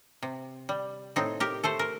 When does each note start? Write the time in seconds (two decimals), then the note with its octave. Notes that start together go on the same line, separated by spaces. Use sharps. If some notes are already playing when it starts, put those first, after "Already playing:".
0.22 C3
0.69 G3
1.16 A2 C4 D#4
1.40 G4 A#4
1.64 A3 A4 C5
1.79 A#4